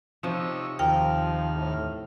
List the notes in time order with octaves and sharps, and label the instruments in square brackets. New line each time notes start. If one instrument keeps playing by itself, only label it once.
[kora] C3 F3 [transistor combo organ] D#4 C#5 E6
[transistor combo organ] D#2 F6 [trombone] F3 [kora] A#4 [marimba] G5
[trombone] A2